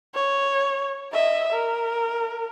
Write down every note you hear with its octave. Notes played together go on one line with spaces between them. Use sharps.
C#5
D#5 E5
A#4